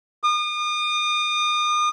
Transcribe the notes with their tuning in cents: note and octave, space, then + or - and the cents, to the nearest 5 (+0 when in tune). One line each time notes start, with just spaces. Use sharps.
D#6 -40